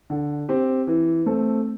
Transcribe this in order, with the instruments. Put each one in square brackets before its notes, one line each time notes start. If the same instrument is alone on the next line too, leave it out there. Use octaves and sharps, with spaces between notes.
[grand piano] D3
C4 G4
E3
A3 C4 A4